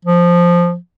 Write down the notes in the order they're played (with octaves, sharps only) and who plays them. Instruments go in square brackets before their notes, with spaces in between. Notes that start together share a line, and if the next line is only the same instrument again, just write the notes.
[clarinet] F3